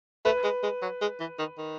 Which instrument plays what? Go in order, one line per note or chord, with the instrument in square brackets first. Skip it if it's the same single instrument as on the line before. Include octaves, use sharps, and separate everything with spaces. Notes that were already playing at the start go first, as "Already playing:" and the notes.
[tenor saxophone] A3 [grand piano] B4
[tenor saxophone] G#3
G#3
F#3
G#3
E3
D#3
D#3